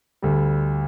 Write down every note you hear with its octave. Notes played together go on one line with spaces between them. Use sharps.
D2 D3 G3